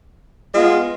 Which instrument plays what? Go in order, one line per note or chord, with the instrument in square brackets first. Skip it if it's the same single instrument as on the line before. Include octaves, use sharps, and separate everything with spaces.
[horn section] G#3 B3 F4